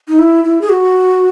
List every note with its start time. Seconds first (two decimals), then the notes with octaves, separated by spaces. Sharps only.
0.08 D#4
0.19 E4
0.44 E4
0.61 G#4
0.69 F#4